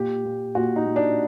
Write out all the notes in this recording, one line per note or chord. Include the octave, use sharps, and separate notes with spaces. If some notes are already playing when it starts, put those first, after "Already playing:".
Already playing: A#2 G4
A#2
A#2 F#4
D#4
A#2
D4